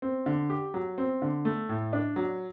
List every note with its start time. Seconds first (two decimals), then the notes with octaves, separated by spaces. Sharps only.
0.02 C4
0.26 D3
0.50 G4
0.74 F#3
0.98 C4
1.22 D3
1.45 A3
1.69 A2
1.93 D4
2.16 F#3